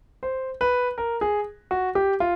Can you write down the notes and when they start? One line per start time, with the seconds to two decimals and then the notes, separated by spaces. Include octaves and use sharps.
0.23 C5
0.61 B4
0.98 A#4
1.21 G#4
1.71 F#4
1.95 G4
2.20 F4